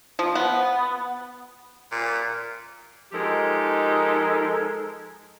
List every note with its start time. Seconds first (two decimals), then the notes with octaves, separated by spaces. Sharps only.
0.19 F3
0.35 B3
1.91 A#2
3.12 F3 G#3 D#4 G4 A4 A#4